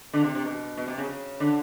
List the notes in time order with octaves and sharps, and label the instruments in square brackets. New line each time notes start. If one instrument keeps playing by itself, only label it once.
[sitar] D3
C3
C3
B2
B2
C3
C#3
C#3
D3